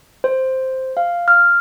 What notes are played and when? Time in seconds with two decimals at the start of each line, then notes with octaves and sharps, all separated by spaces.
0.24 C5
0.97 F5
1.28 F6